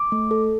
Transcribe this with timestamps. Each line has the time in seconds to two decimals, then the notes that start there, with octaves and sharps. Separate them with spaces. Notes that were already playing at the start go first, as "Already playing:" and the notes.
Already playing: D6
0.12 A3
0.31 A4